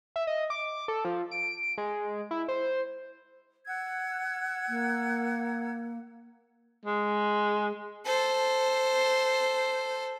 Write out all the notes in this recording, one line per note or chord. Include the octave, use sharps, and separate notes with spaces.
E5
D#5
D6
A4
F3
D7
G#3
E4
C5
F#5 E6 G#6
A#3
G#3
A4 C5